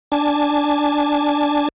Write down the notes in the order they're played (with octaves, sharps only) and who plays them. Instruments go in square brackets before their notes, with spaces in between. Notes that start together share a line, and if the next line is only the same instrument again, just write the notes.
[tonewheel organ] D4 G#5 A5